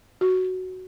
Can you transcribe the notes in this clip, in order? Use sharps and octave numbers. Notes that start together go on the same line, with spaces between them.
F#4